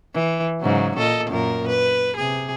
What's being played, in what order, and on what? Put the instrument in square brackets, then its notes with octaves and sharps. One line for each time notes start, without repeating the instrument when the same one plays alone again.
[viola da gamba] E3
G#2 C#3 F#3
A#2 A4 D#5
F#2 A#2 A#4
B4
C3 G#4